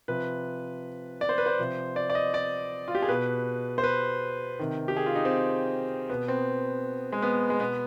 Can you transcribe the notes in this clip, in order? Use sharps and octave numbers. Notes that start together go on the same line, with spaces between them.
C3 F3 B4
D5
C5
B4
C5
C3 F3
D5
D5
D#5
D5
F4
G4
G#4
B2 B4
C5
B4
C3 D#3
G4
G#4
F4
D#4
C4
B2 B3
C4
G#3
B3
G#3
B2 B3